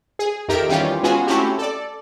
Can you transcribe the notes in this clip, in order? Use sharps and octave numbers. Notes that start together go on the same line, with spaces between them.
G#4
F2 D#3 G4 A#4 E5 D7
D#3 E3 G3 C#4 F4 G4
G#3 B3 C#4 F4 F#4 G#4
A3 C4 C#4 E4 F#4 G4
A4 D5